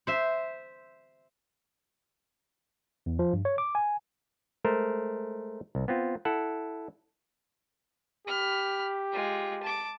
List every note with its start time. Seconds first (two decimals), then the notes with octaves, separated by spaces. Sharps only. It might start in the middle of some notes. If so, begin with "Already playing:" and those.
0.07 C5 E5
3.06 E2
3.19 F3
3.33 G2
3.45 C#5
3.58 D6
3.75 G#5
4.64 G#3 A3 A#4 C5
5.75 C2
5.88 B3 C4 F4
6.25 E4 A4 F#5
8.27 G4 B5 F6
9.12 G#3 F4
9.63 A5 D6